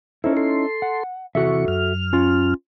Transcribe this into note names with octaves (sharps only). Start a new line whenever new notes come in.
C#4 D#4 E4 A4 C5 E5
A4 C6
F#5
C3 E3 F#4 A4 E5 C#6
F#2 F6
C#4 F4